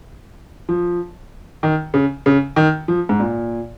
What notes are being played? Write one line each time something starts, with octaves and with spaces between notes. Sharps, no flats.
F3
D#3
C#3
C#3
D#3
F3
G#2
A#2